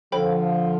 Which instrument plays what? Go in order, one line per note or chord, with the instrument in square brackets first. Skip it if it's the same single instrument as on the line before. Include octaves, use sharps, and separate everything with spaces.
[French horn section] D3 F3 [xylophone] A4 C5 G5 B5